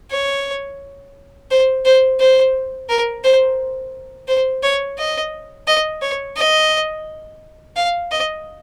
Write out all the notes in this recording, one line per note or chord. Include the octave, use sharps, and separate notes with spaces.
C#5
C5
C5
C5
A#4
C5
C5
C#5
D#5
D#5
C#5
D#5
F5
D#5